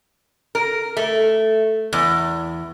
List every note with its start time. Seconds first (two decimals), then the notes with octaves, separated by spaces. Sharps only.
0.55 A#4
0.97 A3
1.93 E2